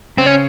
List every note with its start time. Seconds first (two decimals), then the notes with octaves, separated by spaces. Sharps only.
0.18 C#3 C4
0.26 C#4